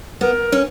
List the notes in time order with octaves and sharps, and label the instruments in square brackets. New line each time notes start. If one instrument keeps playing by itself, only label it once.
[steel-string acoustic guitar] B3 [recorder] A#4
[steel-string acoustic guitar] C#4